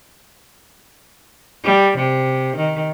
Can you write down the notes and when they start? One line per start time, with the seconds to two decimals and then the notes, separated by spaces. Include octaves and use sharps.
1.64 G3
1.97 C3
2.56 D#3